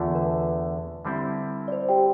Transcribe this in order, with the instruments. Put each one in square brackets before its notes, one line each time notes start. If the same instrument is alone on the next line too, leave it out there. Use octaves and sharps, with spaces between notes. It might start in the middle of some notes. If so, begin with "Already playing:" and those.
Already playing: [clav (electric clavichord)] E2 D3 A3 [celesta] F4
[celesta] B4
[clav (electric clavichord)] D3 G3 C4 E4
[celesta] D5
C5
G4 G5